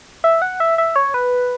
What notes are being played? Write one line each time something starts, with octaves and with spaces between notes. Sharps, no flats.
E5
F#5
E5
E5
C#5
B4